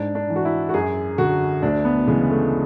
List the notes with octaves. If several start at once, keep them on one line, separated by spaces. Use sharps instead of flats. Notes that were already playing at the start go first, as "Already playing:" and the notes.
Already playing: G#2 D4
D4
E3
F#4
E4
F#4
F#2 G#4
D3 F#4
D2 D4
B3
C#3 E3 G#3
A3